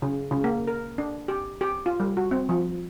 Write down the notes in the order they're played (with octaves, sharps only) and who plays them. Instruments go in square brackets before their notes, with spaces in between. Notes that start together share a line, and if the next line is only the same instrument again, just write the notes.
[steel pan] C#3
C#3
A#3
A#4
D4
G4
G4
F4
G3
F#4
C4
F3